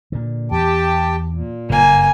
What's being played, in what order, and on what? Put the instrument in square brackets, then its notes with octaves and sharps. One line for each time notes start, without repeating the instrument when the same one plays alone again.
[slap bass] A#2 D3
[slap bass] E2 [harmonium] G4 G5 A5
[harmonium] A#2
[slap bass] F#1 G2 [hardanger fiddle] A#3 G#5